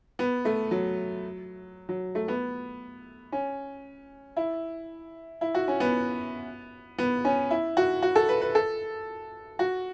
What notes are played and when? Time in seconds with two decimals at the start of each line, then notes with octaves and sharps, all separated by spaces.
0.19 B3
0.45 A3
0.71 F#3
1.89 F#3
2.15 A3
2.28 B3
3.32 C#4
4.37 E4
5.41 E4
5.55 F#4
5.68 C#4
5.80 B3
6.98 B3
7.25 C#4
7.50 E4
7.77 F#4
8.02 F#4
8.16 A4
8.29 B4
8.42 B4
8.55 A4
9.59 F#4